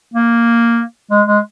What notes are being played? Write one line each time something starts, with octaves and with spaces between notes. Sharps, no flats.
A#3
G#3
G#3